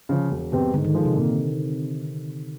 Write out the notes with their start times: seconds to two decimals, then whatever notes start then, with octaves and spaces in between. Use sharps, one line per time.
0.09 C#3 F3
0.31 E1
0.52 E2 B2 G3 C4
0.74 G#2 D3
0.84 D#3
0.94 F3 G#3
1.05 C3
1.16 A#2